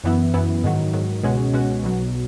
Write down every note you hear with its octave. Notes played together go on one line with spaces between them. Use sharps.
F#2 E3 B3 E4
F#2 E3 B3 E4
G#2 D#3 F#3
G#2 D#3 F#3
C#2 B2 G#3 C#4 F#4
C#2 B2 G#3 C#4 F#4
B1 B2 F#3